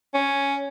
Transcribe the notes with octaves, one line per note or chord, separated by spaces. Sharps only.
C#4